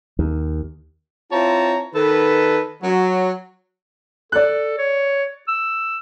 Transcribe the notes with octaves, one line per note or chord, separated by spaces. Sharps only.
D#2
C4 E4 F4 C#5 A5 A#5
D#3 A4 B4
F#3
A4 D5 F#6
C#5
E6